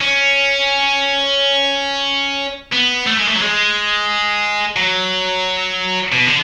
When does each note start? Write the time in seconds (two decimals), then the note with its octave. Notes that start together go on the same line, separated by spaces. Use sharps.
0.01 C#4
2.73 B3
3.07 A3
3.17 G#3
3.27 A3
3.35 F#3
3.41 G#3
4.76 F#3
6.12 B2
6.27 D3